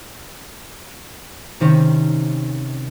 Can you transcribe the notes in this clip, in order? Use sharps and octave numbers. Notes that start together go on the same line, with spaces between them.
C3 D#3 C4 C#4